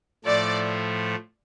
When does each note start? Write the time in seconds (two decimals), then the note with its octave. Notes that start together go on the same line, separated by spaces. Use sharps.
0.25 A2 F3 A3 D5